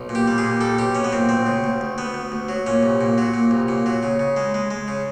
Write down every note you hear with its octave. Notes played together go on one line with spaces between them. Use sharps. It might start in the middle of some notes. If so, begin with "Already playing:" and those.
Already playing: B1
A#2
G4
G3
G#4
A#2
G3 A4
B1 G4
B1 C#4
B3
A#2 C4
D2 C4
C#3
D2
D2
D2 B3
D2
D2
F#3
A#2 C#4
C2
A#2
F#3
A#2
C2
A#2
F#3
C#3
C#3
G#3
G#3
G#3
C#3